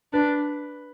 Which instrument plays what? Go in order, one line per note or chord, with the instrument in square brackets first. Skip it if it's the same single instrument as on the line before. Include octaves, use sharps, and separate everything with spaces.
[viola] D4 [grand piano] B4